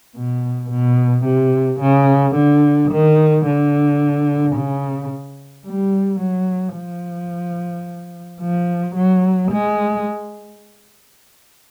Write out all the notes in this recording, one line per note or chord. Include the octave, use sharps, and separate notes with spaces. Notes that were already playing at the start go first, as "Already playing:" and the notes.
B2
B2
C3
C#3
D3
D#3
D3
C#3
G3
F#3
F3
F3
F#3
G#3